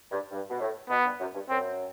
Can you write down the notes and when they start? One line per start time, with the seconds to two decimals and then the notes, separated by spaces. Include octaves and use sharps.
0.12 G2
0.31 G2
0.50 B2
0.61 A2
0.90 B2 B3
1.05 G2
1.20 F#2
1.35 G2
1.49 F#2 C4